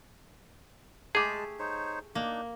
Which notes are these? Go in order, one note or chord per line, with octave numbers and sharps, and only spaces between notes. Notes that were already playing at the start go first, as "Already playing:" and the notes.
G#3 A3 G4 G#4 A5
D#4 C5 C#5
A#3 D4 D#4